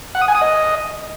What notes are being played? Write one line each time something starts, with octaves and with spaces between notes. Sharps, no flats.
F#5
D#6
G#5
D#6
D#5